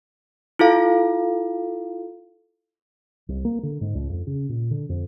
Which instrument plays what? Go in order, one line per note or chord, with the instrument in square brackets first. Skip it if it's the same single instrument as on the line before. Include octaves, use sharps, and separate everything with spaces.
[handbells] E4 F4 A4 F5
[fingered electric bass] C2
A#3
D3
G#2
C#2
F2
C#3
A#2
D3
F2